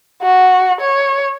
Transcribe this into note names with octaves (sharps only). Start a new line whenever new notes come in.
F#4
C#5